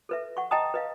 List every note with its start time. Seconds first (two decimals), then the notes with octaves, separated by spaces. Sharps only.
0.09 A4 B4 E5
0.37 F#5 C#6
0.51 D#5 G5 A5 A#5 D#6
0.74 B4 D#5 F5